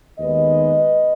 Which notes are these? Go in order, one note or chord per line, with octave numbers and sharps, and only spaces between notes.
D#2 D#3 G#3 B3 B4 D#5